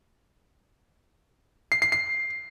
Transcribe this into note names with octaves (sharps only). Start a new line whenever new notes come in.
C7
C7
C7